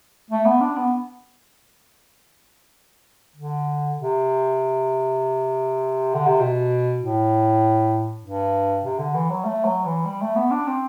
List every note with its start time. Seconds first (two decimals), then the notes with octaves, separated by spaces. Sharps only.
0.30 A3
0.45 B3
0.61 D4
0.76 B3
3.36 D3
3.96 C3
6.14 D3
6.27 C3
6.40 B2
7.01 A2
8.23 G2
8.83 C3
8.98 D3
9.14 E3
9.30 F#3
9.45 A3
9.65 F#3
9.85 E3
10.05 G3
10.21 A3
10.35 B3
10.51 D4
10.67 C4